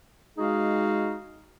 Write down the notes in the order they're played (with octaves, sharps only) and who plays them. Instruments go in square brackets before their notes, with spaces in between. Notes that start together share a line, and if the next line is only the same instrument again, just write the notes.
[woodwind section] G#3 D#4 F#4 G#4 F5